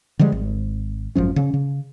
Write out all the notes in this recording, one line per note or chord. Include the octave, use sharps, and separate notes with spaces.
D3 F3 G3 G#3
G#1
G#1 F#2 F3 C#4
C#3 C#4
C#3